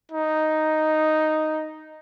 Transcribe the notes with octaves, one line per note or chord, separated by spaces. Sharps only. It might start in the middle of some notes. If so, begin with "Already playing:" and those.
D#4